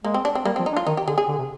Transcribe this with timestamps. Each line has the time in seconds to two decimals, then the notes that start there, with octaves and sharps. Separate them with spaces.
0.04 G#3 A#3
0.14 C4
0.25 D4
0.35 C4
0.45 G3 A#3
0.56 C4
0.59 F3
0.66 D#4
0.73 D4
0.77 F4
0.87 D#3 D#4
0.97 G4
1.07 D3 G#4
1.18 G#4
1.28 D3
1.38 C3